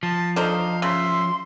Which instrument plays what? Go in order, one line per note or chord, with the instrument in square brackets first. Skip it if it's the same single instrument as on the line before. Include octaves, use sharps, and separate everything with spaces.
[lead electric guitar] F3 [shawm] A5
[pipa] D4 D#4 C5 [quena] A4 [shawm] F5
[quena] A#5
[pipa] C#3 [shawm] E5 [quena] C6